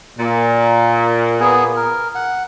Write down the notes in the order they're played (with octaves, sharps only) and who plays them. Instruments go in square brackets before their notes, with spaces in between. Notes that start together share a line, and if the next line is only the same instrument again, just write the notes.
[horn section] A#2
[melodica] B3 G#4 G#5
A#4
F#5